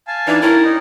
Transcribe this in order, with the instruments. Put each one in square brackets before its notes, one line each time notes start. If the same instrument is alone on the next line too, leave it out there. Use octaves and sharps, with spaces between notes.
[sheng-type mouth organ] F5 G#5 A5
[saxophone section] E3 D4 [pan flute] D#4
[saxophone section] C#4 G4 A#4 [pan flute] E4
[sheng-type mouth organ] D#4